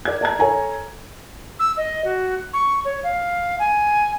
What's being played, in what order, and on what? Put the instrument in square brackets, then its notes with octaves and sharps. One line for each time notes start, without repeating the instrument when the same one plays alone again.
[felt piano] A#4 D5 G#6
D5 A5 A#5 G#6
A4 C#5 G#5 A#5
[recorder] E6
D#5
F#4
C#6
C#5
F5
G#5